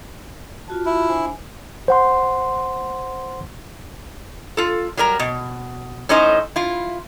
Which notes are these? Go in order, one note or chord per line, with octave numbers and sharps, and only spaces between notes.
F4 F#4 A5
E4
D4 C5 G#5
C5 F#5 C6
F4 A4
F#3 G3 A#4 A#5
B2
A2 C#4 D#4 C5 D#5
E4 F4